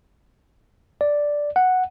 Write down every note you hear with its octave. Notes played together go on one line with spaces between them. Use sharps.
D5
F#5